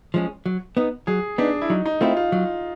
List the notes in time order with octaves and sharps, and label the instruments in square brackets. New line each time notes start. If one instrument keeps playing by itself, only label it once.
[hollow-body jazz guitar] F3 G#3 C#4
F#3
B3 D#4
[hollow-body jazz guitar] F#3 [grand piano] G#4
[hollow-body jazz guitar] B3 D#4 [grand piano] D4
[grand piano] E4
[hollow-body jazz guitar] F#3 [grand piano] D#4
[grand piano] D#4
[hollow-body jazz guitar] A3 C4 E4 [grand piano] F4
[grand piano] F4
[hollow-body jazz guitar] F#3